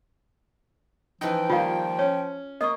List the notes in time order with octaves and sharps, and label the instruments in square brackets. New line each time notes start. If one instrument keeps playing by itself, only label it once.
[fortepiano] E3 D#4 [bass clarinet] F3 [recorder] G5
[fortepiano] D#3 G3 A#3 [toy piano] F4 F5
[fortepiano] C#4 [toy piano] C#5
[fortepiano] A#3 [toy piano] D#5 C#6 [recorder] D#6